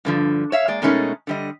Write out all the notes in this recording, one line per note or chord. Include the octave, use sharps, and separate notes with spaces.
G2 D3 F3
C#5 E5 F5
G#3 A#3 D5
B2 G#3 A3 C#4 D#4 A#4
D3 G3 D#5